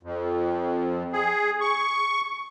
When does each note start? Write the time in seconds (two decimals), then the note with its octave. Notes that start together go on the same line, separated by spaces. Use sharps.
0.03 F2
1.13 G#4
1.61 C#6